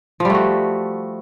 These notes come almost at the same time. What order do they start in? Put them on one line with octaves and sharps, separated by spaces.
F3 G3 A3 F#4